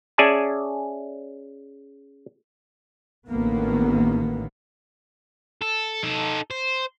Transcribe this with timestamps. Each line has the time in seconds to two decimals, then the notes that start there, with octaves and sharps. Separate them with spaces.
0.18 C#4 G#4 D5 E5 G#5 A5
3.28 A1 A2 D3 D#3 A#3 B3
5.62 A4
6.03 D#4 A4
6.51 C5